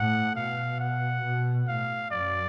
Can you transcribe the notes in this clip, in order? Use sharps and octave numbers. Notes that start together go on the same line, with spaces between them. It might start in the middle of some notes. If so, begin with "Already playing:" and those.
Already playing: A2 F#5
B2 F5
F#5
B2
A2 F5
F#2 D5